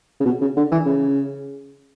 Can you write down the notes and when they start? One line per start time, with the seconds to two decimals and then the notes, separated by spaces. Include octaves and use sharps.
0.20 C#3
0.25 B2
0.41 C#3
0.57 D3
0.72 E3
0.86 C#3